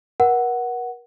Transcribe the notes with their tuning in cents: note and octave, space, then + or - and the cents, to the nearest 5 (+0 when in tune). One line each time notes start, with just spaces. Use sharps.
A#4 +40 F#5 +0